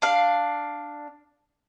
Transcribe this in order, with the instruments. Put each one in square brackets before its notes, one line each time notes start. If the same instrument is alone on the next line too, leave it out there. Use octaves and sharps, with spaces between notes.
[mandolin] D4 F5